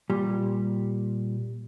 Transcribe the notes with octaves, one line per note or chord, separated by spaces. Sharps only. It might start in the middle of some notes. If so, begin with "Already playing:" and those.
A#2 G3